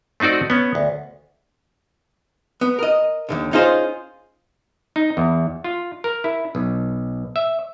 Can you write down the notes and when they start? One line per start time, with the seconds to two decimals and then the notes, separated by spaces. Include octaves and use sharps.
0.20 A3 C4 D#4 F#4 D5
0.50 B3 C#4
0.75 D2
2.61 B3
2.79 A#4 D#5
3.29 D#2 A#2 D3
3.52 C#4 D#4 F4 G#4 C5
4.96 D#4
5.17 E2
5.64 F4
6.04 A#4
6.24 E4
6.55 B1
7.36 E5